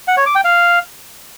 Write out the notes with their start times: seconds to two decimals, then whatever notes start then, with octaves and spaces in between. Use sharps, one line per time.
0.08 F#5
0.17 C#5
0.26 D6
0.35 G5
0.44 F5